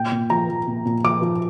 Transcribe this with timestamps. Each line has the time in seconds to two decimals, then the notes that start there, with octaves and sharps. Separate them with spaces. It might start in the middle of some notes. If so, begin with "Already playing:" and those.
Already playing: A#2 G5
0.12 A#2
0.30 F3 A#5
0.48 F3
0.67 A#2
0.86 A#2
1.04 F3 D6
1.22 F3